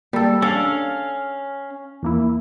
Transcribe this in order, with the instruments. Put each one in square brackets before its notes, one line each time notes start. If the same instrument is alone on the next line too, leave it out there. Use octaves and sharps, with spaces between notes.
[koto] G3 A4 [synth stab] A#3
[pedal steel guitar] C#4 F5 [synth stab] D4 [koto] A4
[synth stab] E2 A#3 E4